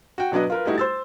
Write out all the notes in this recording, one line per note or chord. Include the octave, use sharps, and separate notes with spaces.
F#4 G5
B2 F#3 D4 B4 D#5
F4 A#4 B4
G3 A3 D#4 E4 F#4
C5 E6 A6